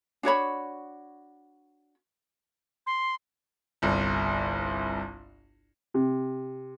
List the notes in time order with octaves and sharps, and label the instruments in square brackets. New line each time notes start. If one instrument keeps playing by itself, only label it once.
[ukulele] D4 F#4 C#5 B5
[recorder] C6
[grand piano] G1 C2
[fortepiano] C3